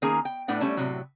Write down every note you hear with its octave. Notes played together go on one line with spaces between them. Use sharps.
D#3 A#3 C#4 G#4 G#5 A#5
G5
A2 A3 B3 D4 F#5
G3 A3 C#4 A5
A2 C3 F#3